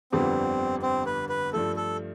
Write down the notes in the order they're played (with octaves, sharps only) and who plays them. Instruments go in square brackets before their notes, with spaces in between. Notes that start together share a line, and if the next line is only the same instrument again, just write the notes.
[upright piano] G1 F2 D3 G3 B3 [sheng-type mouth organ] C4
[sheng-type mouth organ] C4
B4
B4
[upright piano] G2 F3 A3 [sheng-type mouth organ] A4
[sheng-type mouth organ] A4